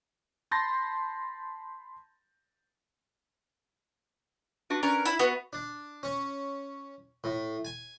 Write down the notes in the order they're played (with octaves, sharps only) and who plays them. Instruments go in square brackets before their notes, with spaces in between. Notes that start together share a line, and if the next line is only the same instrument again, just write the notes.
[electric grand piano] A5 B5 C6 G6 A6 A#6
[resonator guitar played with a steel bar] D4 F#4 B4
[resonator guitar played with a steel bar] C#4 B4 D5 [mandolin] A#4
[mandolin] E4
[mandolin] B3 [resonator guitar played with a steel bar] F#4 F#5
[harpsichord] D4
C#4
A2
G#5